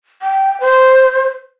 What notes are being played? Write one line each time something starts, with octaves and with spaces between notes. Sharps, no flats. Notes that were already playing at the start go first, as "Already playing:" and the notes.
G5
C5